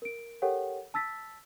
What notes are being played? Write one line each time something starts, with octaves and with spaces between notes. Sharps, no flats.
A#4 D7
G4 A4 A#4 C#5 F#5 G5
A5 E6 A6 B6